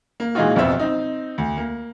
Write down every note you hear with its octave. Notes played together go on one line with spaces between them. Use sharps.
A#3
A#2 E3 G#3 D#4 F4 F#4
D1 F2 B2 B3 C4 E5
C4 D#4
D2
A#3